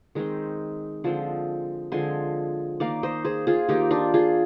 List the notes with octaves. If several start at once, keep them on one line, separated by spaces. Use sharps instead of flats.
D#3 G#3 C4
D3 F3 G#3 C4
D3 F3 G#3 C4 G#5 C6
D#3 A#3 D5 F5
C5 D#5
G#4 C5
F4 G#4
D#3 A#3 D#4 G4
D4 F4
F4 G#4